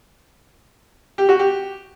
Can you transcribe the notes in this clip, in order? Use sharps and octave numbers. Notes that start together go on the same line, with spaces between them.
G4
F#4
G4